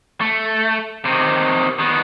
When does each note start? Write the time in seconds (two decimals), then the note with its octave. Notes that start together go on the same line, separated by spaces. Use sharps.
0.20 A3
1.05 C3 D#3
1.79 D#3 B3